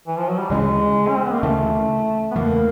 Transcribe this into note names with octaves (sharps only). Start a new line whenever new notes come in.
E3
F3
F#3
G3
D2 C#3 E3 G#3
C#4
C4
B3
A#3
D2 C#3 E3 A3
B3
E2 C#3 E3 A3 A#3